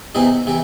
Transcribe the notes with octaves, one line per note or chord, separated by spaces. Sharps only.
E2 C3 E3 D#4
C3 E3